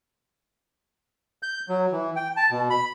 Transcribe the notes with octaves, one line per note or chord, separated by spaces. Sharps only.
G6
F#3
E3
G5
A5
B2
B5